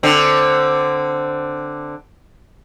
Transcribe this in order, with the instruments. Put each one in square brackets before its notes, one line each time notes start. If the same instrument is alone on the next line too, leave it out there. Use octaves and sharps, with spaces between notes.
[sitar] D3 C4